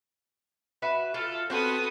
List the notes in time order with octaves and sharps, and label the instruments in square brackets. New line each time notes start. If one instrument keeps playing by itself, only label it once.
[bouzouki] F#4 B4 E5
[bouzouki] F4 [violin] A4
[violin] B3 D#6 [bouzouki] C4 F#4 A4